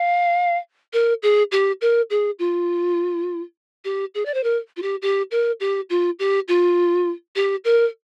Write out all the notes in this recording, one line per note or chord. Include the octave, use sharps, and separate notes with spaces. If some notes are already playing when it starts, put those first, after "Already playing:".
Already playing: F5
A#4
G#4
G4
A#4
G#4
F4
G4
G#4
D5
C5
A#4
F4
G4
G4
A#4
G4
F4
G4
F4
G4
A#4